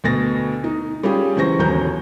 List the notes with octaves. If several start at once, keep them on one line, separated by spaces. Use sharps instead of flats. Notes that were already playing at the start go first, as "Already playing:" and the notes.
D2 B2 A6 A#6
D#4
G3 C#4 F4 G4 G#4
C#2 E3 C5 C#6 A#6
G1 D#2 F#3 C#4 A#5 G6